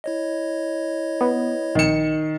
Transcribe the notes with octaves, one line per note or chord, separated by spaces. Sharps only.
E4 C#5 D#5
B3
A#1 D#3 C#7 E7